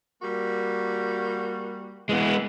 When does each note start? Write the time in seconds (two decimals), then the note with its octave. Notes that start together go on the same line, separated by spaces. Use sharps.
0.22 G3 A#3 F#4
2.09 E3 G#3 B3